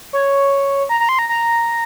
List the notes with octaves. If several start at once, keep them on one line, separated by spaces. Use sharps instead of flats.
C#5
A#5
A#5
C6
A#5
A#5